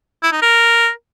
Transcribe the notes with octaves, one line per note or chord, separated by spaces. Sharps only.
E4
D#4
A#4